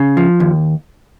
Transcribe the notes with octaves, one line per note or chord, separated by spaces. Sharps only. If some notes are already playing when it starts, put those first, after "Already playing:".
Already playing: C#3
F3
D#2